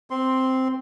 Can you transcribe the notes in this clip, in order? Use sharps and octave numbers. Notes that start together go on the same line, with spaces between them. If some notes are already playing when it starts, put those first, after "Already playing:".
C4 C6